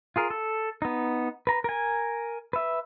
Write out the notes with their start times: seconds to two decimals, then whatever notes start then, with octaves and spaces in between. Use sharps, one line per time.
0.16 F4 G#4 A#4
0.30 A4
0.82 B3 D#4
1.47 B4 A#5
1.64 A#4 G#5
2.53 B4 E5